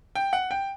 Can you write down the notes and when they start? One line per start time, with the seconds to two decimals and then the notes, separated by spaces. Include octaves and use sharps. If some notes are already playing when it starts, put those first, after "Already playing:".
0.15 G5
0.33 F#5
0.51 G5